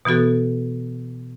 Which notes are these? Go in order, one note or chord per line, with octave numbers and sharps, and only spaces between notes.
B2 E3 B3 F#4 A4